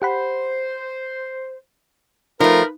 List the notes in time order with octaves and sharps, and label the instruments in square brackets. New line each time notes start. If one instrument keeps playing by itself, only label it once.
[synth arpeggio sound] G4 F#5 B5 [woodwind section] C5
[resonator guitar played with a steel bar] F3 A3 [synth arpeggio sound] D#4 [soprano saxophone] A#4 [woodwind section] B4 B5